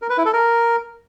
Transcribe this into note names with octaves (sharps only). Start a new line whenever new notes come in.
A#4
B4
E4
A4
A#4